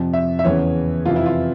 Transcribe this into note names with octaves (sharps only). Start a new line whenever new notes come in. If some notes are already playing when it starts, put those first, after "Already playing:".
Already playing: F2 C3 F3
E5
E5
E2 C#3 E3 C#5
F2 C3 E3 F4
E4
F4